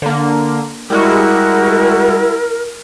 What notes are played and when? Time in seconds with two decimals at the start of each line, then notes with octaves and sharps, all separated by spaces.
0.02 D3 A#3
0.90 G3 G#3 E4 F#4 A#4